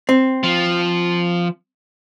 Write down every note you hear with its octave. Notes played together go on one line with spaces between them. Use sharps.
C4
F3